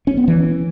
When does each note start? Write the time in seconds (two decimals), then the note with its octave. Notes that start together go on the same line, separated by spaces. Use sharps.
0.07 C#4
0.17 B3
0.28 E3